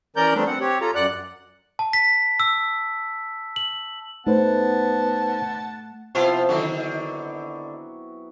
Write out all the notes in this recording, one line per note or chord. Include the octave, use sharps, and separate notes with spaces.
E3 C#4 A#4 D5 A#5 G6
F3 G3 A3 B3 C4 D4
C4 F#5
C4 G4 C#5
F4 A4 A#5
F#2 D5 F#5 F#6
A5
B6
E6
F#7
A3 B3 D#4 B4 C5 F#5 A5
C3 F3 B3 E4 F4 C5
D3 D#3 F#3 E4